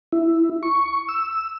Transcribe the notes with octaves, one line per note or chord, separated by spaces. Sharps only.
E4
C#6
E6